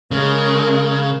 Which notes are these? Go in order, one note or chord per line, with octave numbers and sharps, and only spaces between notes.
C#3 G#3 A#4